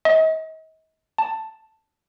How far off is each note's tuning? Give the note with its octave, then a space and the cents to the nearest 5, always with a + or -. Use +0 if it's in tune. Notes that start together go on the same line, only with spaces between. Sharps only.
D#5 +40
A5 +5